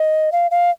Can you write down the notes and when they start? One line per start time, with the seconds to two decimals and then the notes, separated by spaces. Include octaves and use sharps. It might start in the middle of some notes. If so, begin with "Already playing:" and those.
Already playing: D#5
0.32 F5
0.51 F5